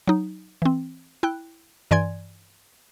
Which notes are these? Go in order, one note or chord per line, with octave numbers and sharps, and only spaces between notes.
F#3 D#4
E3 C4
E4 G5 F#6
G2 E3 D5 G#5 C6 G#6